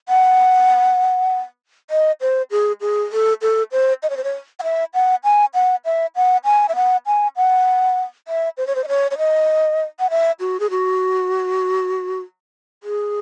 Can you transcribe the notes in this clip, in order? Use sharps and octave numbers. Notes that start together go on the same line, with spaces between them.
F#5
D#5
C5
G#4
G#4
A4
A4
C5
D#5
C#5
C5
C#5
F#5
E5
F#5
G#5
F#5
E5
F#5
G#5
E5
F#5
G#5
F#5
E5
C5
C#5
C5
D#5
C#5
C#5
D#5
F#5
E5
F#4
G#4
F#4
G#4